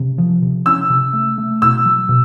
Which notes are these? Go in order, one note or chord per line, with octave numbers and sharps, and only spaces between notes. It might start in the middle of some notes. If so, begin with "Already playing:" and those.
Already playing: C3 C#4
F3
C3
C#4 E6
C3
A3
A3
B2 E6
F#3
B2